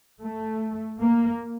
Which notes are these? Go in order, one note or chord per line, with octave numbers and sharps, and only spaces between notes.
A3
A#3